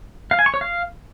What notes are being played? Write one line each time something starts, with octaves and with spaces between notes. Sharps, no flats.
F5
G#5
C#6
C#5
F5